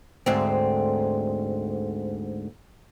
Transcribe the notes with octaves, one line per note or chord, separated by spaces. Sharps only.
D2 G#2 C4